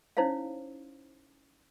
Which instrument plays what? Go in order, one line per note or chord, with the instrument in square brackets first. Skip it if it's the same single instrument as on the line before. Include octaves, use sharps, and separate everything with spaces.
[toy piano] C#4 D#4 E4 C5 C#5 F5